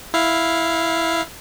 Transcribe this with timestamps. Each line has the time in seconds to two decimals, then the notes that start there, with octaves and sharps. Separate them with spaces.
0.14 E4 F5